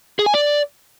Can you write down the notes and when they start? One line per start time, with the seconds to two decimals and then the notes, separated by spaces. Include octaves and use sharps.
0.19 G#4
0.26 G#5
0.34 D5